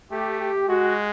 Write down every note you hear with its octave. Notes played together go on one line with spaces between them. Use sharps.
A3 G4
G4
G#3 F#4